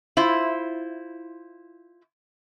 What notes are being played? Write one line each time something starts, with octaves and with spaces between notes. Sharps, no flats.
E4 F4 C5